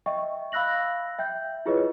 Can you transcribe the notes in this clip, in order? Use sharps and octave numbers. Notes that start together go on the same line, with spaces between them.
D#5 E5 G5 C#6
F5 B5 E6 F#6 A#6 F#7
E5 G5 G6
E4 F4 G#4 B4 C#5 D#5